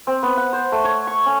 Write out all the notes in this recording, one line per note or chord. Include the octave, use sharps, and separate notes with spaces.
C4
B3
F#5
C5
A3
C#5
C#6
C#4